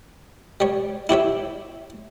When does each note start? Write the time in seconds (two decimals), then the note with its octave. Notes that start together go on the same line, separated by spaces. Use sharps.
0.60 G3 C#5
1.09 E4 G4 C#5 E5